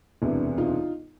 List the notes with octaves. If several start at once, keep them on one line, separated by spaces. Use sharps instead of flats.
E1 D2 C3 E3
D#4 F4